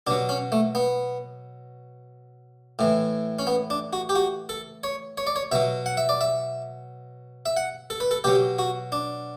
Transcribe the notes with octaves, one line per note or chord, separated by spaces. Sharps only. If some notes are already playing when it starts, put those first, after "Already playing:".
B2 F#3 D4
C#4
A3
B3
A2 E3
C#4
B3
D4
F#4
G4
F#4
A4
C#5
C#5
D5
C#5
B2 F#3 E5
F#5
E5
D5
E5
E5
F#5
A4
B4
A4
B2 F#3 G4
F#4
D4